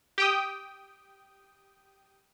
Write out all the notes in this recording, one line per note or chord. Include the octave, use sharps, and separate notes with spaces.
G4 G5 D#6